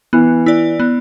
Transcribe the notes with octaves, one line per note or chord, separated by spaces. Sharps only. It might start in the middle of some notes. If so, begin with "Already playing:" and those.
E3 B3
E4 D5
B3